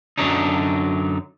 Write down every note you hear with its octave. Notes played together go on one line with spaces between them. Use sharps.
F#2 D3 F#3 D4 D#4